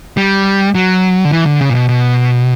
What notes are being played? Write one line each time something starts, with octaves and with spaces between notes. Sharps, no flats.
G3
F#3
D3
E3
D3
C#3
A#2
B2
B2